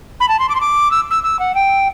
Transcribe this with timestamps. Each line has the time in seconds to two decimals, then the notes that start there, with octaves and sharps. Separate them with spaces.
0.20 B5
0.29 A5
0.39 C6
0.49 D6
0.55 C6
0.61 D6
0.91 E6
1.11 E6
1.23 E6
1.39 F#5
1.55 G5